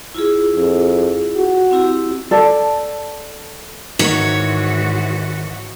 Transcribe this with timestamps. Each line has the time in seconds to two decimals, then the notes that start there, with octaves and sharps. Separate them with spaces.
0.15 E4 F4 G#4
0.55 F2
1.36 F#4
1.71 C4 E4 G4
2.31 A4 D5 A5
3.99 G#2 D#3 E3 F#4 C#5